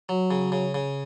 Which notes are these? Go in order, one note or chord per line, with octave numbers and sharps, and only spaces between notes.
F#3
C#3
C#3
C#3